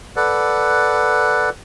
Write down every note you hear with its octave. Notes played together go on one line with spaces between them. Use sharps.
A4 B4 D5 F#5